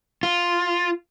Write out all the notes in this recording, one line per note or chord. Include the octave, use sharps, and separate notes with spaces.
F4